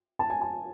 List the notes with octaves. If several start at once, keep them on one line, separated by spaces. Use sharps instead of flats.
A5
G#5
A5